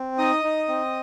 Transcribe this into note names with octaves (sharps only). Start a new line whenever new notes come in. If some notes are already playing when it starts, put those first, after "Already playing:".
Already playing: C4
D#4 D#5 D#6
D#4
C4